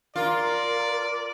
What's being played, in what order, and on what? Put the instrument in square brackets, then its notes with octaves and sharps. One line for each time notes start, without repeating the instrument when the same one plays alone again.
[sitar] F4 [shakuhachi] A#4 [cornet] D5